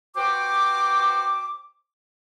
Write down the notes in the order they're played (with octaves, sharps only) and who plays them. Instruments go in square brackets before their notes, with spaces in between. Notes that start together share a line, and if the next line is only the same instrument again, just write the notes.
[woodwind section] F#4 B4 C5 G5 D6